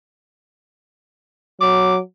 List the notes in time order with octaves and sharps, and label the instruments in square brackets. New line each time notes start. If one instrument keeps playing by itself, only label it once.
[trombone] F#3 [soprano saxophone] D6